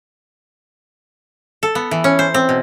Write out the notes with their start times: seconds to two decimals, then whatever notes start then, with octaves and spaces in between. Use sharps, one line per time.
1.63 A4
1.75 B3
1.91 E3
2.04 C#4
2.19 C5
2.34 C4
2.49 B2